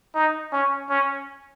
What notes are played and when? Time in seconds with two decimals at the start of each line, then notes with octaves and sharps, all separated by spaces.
0.15 D#4
0.52 C#4
0.90 C#4